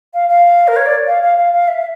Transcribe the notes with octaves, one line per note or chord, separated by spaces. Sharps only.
F5
F5
A#4
C#5
D5
F5
F5
F5
F5
E5
E5